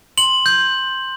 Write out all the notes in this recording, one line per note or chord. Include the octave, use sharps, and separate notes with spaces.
C6 F#7
G6